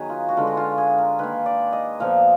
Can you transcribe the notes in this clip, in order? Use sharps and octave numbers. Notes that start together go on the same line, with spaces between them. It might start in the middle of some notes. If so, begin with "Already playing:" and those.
Already playing: D#3 F#3 B3 G#4 B4
F4
F#4
D3 G#3 B3 F4
F#4
F4
G#4
A#4
D#3 A#3 B4
D5
D#5
A#2 F3 B3 F5